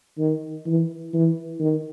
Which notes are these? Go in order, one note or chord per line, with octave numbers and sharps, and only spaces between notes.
D#3
E3
E3
D#3